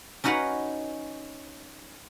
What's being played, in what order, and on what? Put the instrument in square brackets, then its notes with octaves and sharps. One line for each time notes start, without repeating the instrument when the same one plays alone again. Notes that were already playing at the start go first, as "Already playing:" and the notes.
[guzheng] C#4 D#4 F#4 B4 F5 F#5